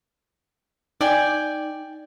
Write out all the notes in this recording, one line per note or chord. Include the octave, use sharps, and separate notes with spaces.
D#4 D5 G5 G#5